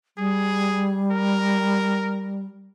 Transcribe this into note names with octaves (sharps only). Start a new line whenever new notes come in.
G3 G#4
A#4